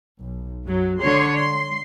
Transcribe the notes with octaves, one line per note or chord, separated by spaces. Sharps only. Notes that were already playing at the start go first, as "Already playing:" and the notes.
B1
F#2 F#3
D3 C#5 C6
C6